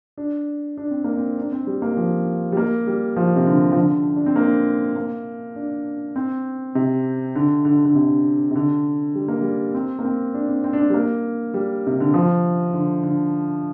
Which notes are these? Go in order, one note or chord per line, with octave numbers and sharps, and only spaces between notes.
D4
D4
C4
A#3
C4
D4
C4
G3
A#3
F3
G3
A#3
G3
F3
C3
D3
F3
D3
D4
C4
A#3
A#3
D4
C4
C3
D3
D3
D3
C3
C3
D3
G3
A#3
G3
C4
A#3
C4
D4
C4
C4
D4
C4
G3
A#3
G3
C3
D3
F3
D3
D3